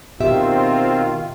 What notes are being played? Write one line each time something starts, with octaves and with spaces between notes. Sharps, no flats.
B2 D#3 C4 F4 G4 E5